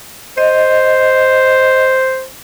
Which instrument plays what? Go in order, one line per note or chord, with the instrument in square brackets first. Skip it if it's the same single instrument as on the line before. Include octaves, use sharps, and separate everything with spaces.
[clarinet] C5 [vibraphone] D#5